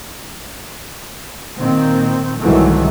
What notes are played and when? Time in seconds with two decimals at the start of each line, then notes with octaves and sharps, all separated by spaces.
1.58 A#2 D#3 C4
2.40 C2 G#2 D#3 E3 F#3 A3